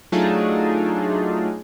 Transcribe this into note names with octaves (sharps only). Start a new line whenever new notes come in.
F#3 A3 D4 D#4 F4 G#4